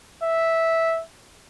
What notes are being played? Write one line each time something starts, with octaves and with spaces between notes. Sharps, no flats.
E5